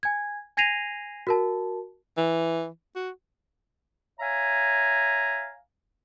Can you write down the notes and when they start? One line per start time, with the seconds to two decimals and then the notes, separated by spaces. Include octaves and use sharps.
0.03 G#5 G#6
0.57 G#5 G#6 A#6 C7 D#7 F7
1.27 F#4 A#4 A5
2.17 E3
2.95 F#4
4.20 C#5 E5 F5 G#5 A#5